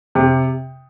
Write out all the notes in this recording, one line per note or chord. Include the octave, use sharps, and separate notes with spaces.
C3